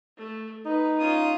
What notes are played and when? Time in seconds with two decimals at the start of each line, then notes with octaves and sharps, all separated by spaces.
0.17 A3
0.66 D#4 B4
0.99 C#4 F4 D#6